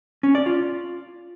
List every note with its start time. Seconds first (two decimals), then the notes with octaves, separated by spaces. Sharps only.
0.23 C#4
0.35 D5
0.46 F4